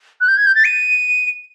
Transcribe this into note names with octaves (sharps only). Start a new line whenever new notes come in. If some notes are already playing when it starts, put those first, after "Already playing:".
F#6
G6
G#6
G6
A6
D#7